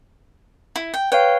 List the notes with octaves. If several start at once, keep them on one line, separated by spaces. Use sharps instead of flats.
E4
G5
B4 C#5 F5 G5